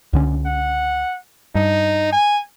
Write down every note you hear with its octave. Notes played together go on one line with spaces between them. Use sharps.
C#2 D3 C#4
F#5
G2 D#4
G#5